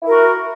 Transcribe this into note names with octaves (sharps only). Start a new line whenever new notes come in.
E4 F#4 A#4